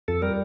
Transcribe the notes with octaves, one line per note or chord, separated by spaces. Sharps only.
F2 A4
G3 A#4